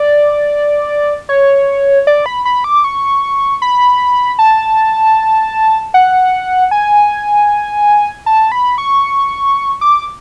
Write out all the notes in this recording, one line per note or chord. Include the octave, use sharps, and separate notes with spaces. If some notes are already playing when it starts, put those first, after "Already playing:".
Already playing: D5
C#5
D5
B5
B5
D6
C#6
B5
A5
F#5
G#5
A5
B5
C#6
D6